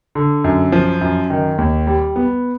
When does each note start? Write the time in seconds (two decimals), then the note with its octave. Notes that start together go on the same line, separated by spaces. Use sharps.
0.15 D3
0.44 F#2
0.72 F3
1.01 F#2
1.30 D#3
1.58 D#2
1.87 G3
2.16 B3